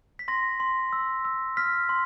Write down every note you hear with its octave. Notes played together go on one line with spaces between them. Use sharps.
B6
C6 A#6
C6
E6
E6
F6 B6
C6